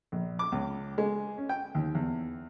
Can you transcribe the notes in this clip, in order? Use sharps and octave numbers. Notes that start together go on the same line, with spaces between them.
A#1
D6
C#2
G#3
C#4
G5
D#2
E2